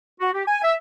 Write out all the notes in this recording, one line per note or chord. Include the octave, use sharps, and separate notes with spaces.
F#4
G4
G#5
E5